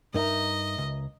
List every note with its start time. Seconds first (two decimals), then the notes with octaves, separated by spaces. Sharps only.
0.14 G2 D#4 A#4 D#5 E5 A#5
0.78 C#2